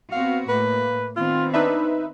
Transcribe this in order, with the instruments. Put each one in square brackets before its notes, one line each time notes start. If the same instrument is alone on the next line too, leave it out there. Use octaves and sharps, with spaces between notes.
[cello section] B3 C4 F#4 [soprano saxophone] F5
[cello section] A2 A#3 [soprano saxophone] B4
[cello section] D#3 B3 C4 [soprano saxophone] F4
[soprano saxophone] D4 [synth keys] D#4 B4 E5